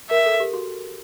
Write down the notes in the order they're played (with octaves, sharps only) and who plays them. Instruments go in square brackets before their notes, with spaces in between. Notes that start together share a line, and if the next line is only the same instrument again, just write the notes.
[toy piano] A#4 [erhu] E5
[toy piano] A4
G4
F#4